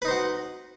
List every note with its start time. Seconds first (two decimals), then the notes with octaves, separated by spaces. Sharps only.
0.02 B4
0.05 D#4
0.08 C5
0.11 F#4